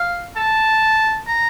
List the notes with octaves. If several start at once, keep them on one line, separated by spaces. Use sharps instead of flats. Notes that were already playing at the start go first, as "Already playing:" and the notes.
Already playing: F5
A5
A#5